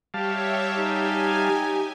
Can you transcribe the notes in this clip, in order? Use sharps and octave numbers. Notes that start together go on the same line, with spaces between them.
G3 G4 C#5 E5 F5 A5
D#4 G#5